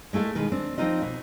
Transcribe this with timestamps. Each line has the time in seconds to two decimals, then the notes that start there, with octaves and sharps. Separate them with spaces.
0.13 G#3 A3 E4 A4 F5
0.35 B2 D#3 G#3 B4
0.52 C4 D4
0.78 F3 C4 D#4 F4 D#5
1.02 B2